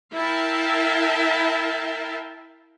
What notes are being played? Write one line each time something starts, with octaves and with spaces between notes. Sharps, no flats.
E4 A#4 E5 F5 G5 A5